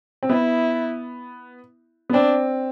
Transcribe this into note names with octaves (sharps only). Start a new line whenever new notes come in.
C4
B3 E4
B3
C4 D4